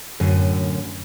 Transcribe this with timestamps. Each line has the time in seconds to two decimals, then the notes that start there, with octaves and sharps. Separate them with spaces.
0.20 F#2 A2 D3